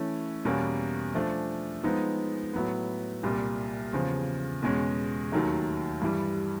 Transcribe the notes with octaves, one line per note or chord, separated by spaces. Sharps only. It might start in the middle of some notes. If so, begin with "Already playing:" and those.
Already playing: E3 A3 C#4
E2 B2 G3 A#3 C#4
F3 A3 D4
F3 G#3 B3 D#4
A2 F#3 B3
C2 A#2 G3
E2 C#3 F3
E2 B2 G#3 C#4
D#2 D#3 F#3 A3
G2 E3 G3